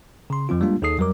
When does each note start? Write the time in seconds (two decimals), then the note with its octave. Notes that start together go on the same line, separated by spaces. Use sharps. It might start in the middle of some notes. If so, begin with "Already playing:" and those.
0.30 C#3 C6
0.49 F2 F3 C4 F4
0.61 G3 G#3 A#3 D4 F4
0.82 D#2 D#4 G#4 A4 D#6 C7
0.98 F2 F#3 G3 A#4 D6